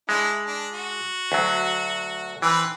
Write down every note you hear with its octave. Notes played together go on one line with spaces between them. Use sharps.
G#3 D4 E4
D4
F#4
D2 F#3
E3 C4 B4